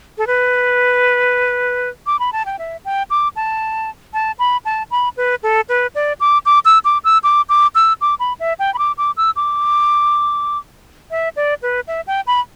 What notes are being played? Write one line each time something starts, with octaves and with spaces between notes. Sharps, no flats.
A4
B4
D6
B5
A5
G5
E5
G5
D6
A5
A5
B5
A5
B5
B4
A4
B4
D5
D6
D6
E6
D6
E6
D6
D6
E6
D6
B5
E5
G5
B5
D6
D6
E6
D6
E5
D5
B4
E5
G5
B5